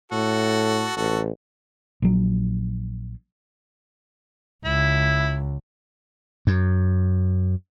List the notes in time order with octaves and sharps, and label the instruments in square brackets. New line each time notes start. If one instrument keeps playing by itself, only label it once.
[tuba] A2 [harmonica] F#4 A4
[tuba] A1 [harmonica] F#4 A4
[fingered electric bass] A#1 F#3
[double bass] C#2 [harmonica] E4
[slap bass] F#2